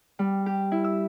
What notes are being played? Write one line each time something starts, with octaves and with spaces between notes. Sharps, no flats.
G3
G4
E4
E6